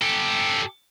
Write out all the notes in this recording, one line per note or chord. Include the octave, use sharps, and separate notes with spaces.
G4 A4